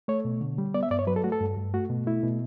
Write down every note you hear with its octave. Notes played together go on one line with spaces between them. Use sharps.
A3 C#5
B2
D3
G3
B3 D5
E5
G2 D5
C#5
F#3 B4
A4
A3 F#4
A4
G2
G2
A3 F#4
B2
A3 E4
B2